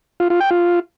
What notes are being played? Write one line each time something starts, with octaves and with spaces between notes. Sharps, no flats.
F4
F4
G5
F4